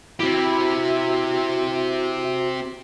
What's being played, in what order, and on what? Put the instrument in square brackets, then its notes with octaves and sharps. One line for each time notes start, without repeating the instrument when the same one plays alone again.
[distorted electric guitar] C4 G4 [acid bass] E4 [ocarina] F#4